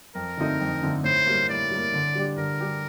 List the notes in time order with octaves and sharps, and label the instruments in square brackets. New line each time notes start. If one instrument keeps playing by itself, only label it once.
[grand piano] F2 [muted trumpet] A#4
[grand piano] D3 A3 C4 D#4
F2
D3 A3 C4 D#4
[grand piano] A2 [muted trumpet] C5
[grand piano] G3 A#3
[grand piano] A2 [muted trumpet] D5
[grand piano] G3 A#3
D3
G3 D4 G4
[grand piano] D3 [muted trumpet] A#4
[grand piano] G3 D4 G4